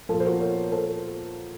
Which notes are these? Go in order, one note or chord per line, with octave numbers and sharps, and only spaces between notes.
A#2 F3 F4 A4
C5
F#4 A#4
A#4 C#5
A4 C5